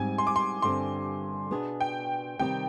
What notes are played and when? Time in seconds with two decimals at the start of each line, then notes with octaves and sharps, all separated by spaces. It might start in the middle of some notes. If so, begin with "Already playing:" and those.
Already playing: G#2 G3 C4 G#5
0.18 C6
0.27 D6
0.36 C6
0.62 G2 D3 G3 C4 C6
1.51 B2 B3 D4 G#4
1.81 G5
2.39 C3 D#3 G3 C4 G4 G5